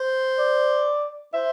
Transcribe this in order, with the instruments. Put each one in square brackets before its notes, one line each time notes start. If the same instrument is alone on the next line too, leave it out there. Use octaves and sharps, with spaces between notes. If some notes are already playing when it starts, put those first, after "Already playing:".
Already playing: [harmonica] C5
[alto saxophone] D5
[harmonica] C5 [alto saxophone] E5